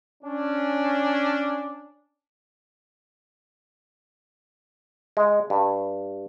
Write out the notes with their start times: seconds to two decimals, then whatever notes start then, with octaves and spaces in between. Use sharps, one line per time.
0.24 C#4 D4
5.17 G#3
5.50 G2